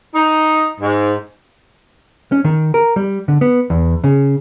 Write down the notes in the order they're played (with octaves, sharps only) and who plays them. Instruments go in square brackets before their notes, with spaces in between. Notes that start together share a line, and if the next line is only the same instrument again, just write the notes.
[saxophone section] D#4
G#2
[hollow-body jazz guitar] C#4
D#3
A#4
G3
D3
B3
E2
C#3